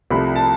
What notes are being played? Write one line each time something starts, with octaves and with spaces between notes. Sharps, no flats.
C2 C3 F3 A3 B5
A5